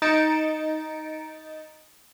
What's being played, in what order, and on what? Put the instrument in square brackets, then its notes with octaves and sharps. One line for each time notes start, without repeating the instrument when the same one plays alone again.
[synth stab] D#4 A6 C#7 D7 E7